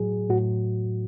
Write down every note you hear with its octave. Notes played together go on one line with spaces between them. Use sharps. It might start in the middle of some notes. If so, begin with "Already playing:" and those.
Already playing: A2 F#3 G#4
A2 F#4